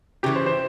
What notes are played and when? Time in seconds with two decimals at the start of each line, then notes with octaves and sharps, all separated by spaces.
0.23 C#3 E3 G3 G4
0.35 C5
0.46 C5